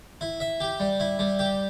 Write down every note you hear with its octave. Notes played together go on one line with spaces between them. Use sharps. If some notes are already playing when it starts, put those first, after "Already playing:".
E4
E5
G4
G3
E4
G3
G4